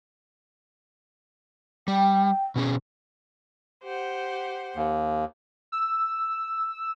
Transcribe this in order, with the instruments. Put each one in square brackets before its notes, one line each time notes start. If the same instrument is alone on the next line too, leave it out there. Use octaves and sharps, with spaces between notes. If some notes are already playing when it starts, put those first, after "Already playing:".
[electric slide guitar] G3 [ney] G5
[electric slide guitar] B2 C#4 G#4
[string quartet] G4 C5 F#5
[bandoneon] D#2
[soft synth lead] E6